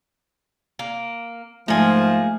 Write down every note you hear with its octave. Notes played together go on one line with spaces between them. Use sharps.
A#3
G#2 F3 A3 A#3 G#4